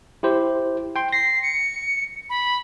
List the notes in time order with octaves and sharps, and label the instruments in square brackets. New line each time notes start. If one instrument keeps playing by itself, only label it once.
[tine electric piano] E4 G4 C5
G5 C6
[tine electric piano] A#6 [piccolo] C7
[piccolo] C#7
B5